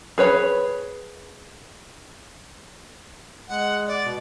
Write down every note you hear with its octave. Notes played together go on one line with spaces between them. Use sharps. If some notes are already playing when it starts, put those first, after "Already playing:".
G#4 B4 C#5 B5
G#3 F#5
D5
B2